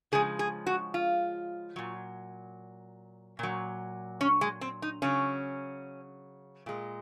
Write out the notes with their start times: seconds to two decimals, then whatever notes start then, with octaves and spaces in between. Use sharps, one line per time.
0.12 C#3 F3 G#3 G#4
0.39 G#4
0.66 F#4
0.94 F4
1.76 A#2 F#3
3.39 A#2 F#3
4.21 C#4
4.41 G#3
4.61 C4
4.82 D#4
5.02 C#3 F#3 C#4
6.66 A#2 G#3